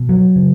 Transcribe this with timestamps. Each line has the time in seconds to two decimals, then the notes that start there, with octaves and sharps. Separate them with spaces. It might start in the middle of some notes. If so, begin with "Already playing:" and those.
Already playing: B2
0.09 F#3
0.36 C#3